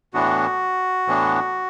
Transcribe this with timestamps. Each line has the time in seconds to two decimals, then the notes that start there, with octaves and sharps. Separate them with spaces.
0.14 A2 E3 B3 D4 F#4
1.07 A2 E3 B3 D4